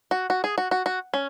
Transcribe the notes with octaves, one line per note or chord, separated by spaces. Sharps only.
F#4
F#4
G#4
F#4
F#4
F#4
C#4